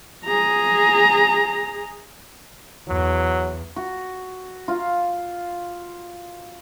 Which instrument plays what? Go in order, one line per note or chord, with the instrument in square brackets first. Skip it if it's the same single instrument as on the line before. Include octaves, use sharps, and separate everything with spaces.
[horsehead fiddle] G#4 A#5
[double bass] E2 [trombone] F#3
[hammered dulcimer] F#4
F4 F5